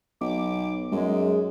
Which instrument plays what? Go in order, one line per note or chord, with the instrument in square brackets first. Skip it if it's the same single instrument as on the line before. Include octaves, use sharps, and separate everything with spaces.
[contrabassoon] B1 [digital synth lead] D6
[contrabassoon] F#2 [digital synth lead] G#3